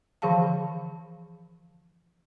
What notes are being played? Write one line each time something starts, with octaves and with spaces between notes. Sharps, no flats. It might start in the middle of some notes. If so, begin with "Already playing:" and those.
D3 E3 F3 G#4 F5 A5